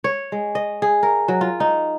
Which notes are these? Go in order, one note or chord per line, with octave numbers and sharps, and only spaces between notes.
C#5
G#3
D#5
G#4
A#4
F#3
F4
D#4